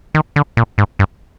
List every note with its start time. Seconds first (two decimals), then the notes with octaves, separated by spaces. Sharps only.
0.15 D#3
0.36 D3
0.57 A#2
0.78 G#2
0.99 G2